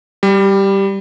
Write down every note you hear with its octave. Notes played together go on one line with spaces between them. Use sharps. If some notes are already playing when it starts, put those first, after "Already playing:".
G3